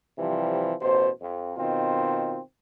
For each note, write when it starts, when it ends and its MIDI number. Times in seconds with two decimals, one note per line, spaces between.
0.18 0.72 48
0.18 0.72 52
0.18 0.72 53
0.18 0.72 55
0.81 1.09 33
0.81 1.09 47
0.81 1.09 72
1.21 1.56 41
1.57 2.38 47
1.57 2.38 51
1.57 2.38 60
1.57 2.38 65